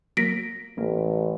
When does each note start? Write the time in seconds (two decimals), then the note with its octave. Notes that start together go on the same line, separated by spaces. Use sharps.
0.17 F#3 A#3 A#6 B6 D7
0.78 A1 A#3